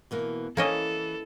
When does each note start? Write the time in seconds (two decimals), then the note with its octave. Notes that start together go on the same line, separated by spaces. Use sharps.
0.11 B2 E3 A#3
0.57 E3 A#3 C#4 A4 D#5